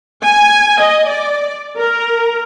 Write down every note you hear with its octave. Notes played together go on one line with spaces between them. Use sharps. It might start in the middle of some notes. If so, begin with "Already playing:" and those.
G#5
D#5
D5
A#4